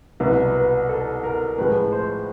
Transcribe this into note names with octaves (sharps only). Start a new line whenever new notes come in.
C2 B2 F#3 B4
B4
A4
A#4
A2 F3 G#3 B4
C5